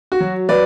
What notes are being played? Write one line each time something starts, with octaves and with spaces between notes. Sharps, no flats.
F#4
F#3
F#3 B4 D5